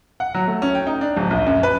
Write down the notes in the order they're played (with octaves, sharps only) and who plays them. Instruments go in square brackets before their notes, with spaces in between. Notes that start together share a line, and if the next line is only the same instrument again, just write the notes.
[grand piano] F#5
F#3
A3
C#4
G5
D#4
D4
D1
A#1
F#2
B4